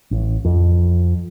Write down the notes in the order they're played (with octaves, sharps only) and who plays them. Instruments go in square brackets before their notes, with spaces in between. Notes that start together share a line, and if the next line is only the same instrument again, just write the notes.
[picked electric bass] A1
F2